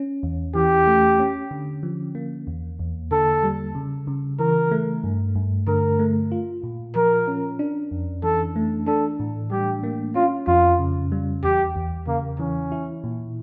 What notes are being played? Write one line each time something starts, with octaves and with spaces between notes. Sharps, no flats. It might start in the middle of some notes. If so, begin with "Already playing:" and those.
Already playing: C#4
E2
E3 G4
A3
C#4
D3
F3
A#3
E2
E2
D3 A4
G3
C#3
C#3
E3 A#4
A3
G2
G2
D3 A#4
A3
F4
A#2
F3 A#4
C#4
D4
F2
E3 A4
A3
D4 A4
A2
G3 G4
A#3
C#4 F4
F2 F4
C#3
G3
E2 G4
E2
C#3 A#3
E3 C#4
E4
A#2